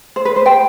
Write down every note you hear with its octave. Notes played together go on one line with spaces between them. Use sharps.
C5
B4
C5
G5